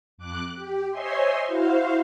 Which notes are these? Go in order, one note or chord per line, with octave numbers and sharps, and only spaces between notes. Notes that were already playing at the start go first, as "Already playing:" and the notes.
F2 D6 F#6
G4
C5 C#5 D#5 E5 G#5 C6
E4 F#4 C5 F5